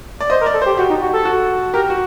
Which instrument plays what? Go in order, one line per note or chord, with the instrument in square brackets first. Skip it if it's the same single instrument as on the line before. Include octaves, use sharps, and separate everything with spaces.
[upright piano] D5
[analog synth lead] C5 [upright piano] D#5
[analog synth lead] A#4
[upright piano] D5
[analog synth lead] A4
[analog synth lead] G4 [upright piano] C5
[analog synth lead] F#4 [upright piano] G4
[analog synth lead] D#4
F#4
A4
[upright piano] F#4
[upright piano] G4 [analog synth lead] A#4
[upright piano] F#4